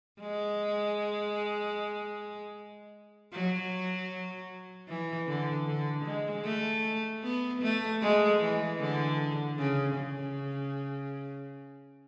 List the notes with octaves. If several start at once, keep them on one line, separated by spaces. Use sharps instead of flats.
G#3
F#3
E3
D3
D3
G#3
A3
B3
A3
G#3
E3
D3
C#3
C#3